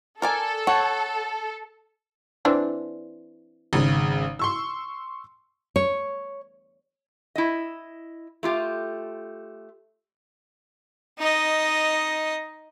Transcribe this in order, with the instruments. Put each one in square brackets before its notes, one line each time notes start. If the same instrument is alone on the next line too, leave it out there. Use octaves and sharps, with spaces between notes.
[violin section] A4 [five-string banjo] A#4 D5 G#5
[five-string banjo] C#5 [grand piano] F#5 A5
[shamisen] E3 C4 D4
[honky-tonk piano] G#1 C#3
C6 C#6 E6
[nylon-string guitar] C#5
[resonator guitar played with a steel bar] E4 D#5
A3 F4 G4
[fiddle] D#4 D#5